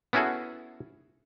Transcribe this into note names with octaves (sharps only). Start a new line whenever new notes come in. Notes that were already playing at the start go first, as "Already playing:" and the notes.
B3 C#4 E4 F#4 G#4 A4